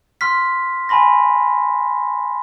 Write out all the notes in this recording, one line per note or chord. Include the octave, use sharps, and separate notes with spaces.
C6 F6 B6
G#5 A5 B5 C6 A#6